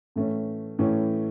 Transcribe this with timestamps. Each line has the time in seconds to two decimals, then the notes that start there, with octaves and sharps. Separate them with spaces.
0.16 A2 E3 A3 C#4
0.79 A2 E3 A3 C#4